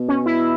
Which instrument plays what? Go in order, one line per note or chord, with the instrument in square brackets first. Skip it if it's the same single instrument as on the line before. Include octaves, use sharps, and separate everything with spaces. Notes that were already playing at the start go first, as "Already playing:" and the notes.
Already playing: [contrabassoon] B2
[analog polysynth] C#4
E4